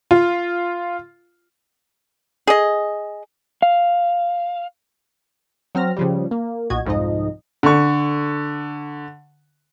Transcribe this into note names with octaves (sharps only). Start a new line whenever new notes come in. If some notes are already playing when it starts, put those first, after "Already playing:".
F4
G#4 D#5
F5
F#3 C4 F6 A#6
C#3 F3 G3
A#3
B1 A#2 F#4 D#5 G#6
C2 F2 G#2 F3 D#4 D#5
D3 C#6